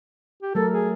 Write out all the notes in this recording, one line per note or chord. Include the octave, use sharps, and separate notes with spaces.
G4
F#3 A3 A4 A#4
G#4